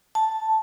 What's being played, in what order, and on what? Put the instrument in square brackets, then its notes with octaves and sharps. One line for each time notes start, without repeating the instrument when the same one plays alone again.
[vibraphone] A5